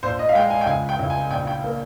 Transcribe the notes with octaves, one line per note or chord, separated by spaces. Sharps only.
A#1 C5
D#5
F5
G#3 G5
G#5
G5
C#2 G#5
G5
C#2
G#5
A#1 G5
G5
A#3